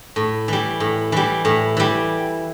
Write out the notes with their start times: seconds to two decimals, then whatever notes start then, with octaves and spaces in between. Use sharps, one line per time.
0.16 A2
0.48 E3 G3
0.80 A2
1.12 E3 G3
1.45 A2
1.77 E3 G3